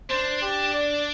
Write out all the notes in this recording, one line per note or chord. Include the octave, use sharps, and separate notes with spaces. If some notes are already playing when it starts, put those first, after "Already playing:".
D4 C5
G4
D5